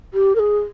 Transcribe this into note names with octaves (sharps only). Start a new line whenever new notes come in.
G4
A#4
G#4